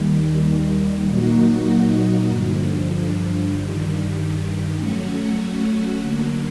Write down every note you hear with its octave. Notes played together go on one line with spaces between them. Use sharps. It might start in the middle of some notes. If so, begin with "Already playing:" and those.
Already playing: D#2 D#3 G3
A#2 F#3 A#3 D#4 F#4
G2 D3 F3
G2 D#3 G3
F#3 A3 C#4 F#4
D3 F#3 A#3